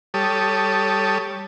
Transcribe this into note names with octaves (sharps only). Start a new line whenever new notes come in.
G3 G4 A4 C#5 A5 D#6